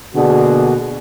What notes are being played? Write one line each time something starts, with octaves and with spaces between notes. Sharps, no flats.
B2 D3 A#3 D4 F#4 G#4